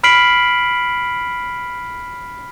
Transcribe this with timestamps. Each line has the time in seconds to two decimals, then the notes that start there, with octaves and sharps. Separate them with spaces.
0.04 B5 F6 B6 C7 D7 F#7